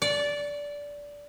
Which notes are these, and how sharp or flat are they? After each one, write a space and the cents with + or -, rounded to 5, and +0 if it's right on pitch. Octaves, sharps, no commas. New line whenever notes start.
D5 -15